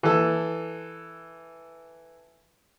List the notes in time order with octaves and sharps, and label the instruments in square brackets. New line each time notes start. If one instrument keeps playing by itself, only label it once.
[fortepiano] E3 A4